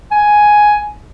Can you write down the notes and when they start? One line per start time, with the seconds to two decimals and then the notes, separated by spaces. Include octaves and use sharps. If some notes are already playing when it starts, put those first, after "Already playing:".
0.11 G#5